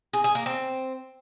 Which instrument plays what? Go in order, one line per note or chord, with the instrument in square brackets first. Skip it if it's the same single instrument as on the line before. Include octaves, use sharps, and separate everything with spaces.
[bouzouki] G#4
G#4
A#3
C4